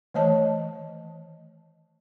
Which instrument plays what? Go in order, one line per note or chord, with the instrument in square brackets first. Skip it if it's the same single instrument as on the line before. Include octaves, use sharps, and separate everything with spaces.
[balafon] D#3 E3 A3 C#5 D#5 A5